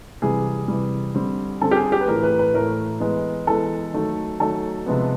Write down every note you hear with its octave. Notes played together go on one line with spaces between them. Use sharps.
C3 E3 G3 G#4
C3 E3 G3
D3 G3 C4
D3 G3 C4 A4
G4
G#4
G4
B4
A2 E3 A3 A#4
B4
B4
A2 E3 A3 A#4
E3 G#3 B3
E3 G#3 B3 A4
D#3 F#3 A3
D#3 F#3 A3 A4
C3 F3 G#3 B3